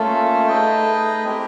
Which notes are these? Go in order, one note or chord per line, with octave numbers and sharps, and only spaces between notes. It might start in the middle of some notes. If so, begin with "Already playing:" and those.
Already playing: A3 A#3 C#4 F4 A4
D#4 G#4 B4 D#5 G5
G#3 C4 E4 G4 A#4